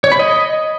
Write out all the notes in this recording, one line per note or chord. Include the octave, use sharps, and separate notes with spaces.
C#5
B5
D#5